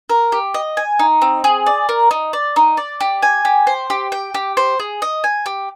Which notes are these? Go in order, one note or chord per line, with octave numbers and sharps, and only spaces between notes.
A#4
G4
D#5
G#5
D#4
C4
G#4
D5
A#4
D#4
D5
D#4
D5
G4
G#5
G4
C5
G4
G5
G4
C5
G#4
D#5
G#5
G4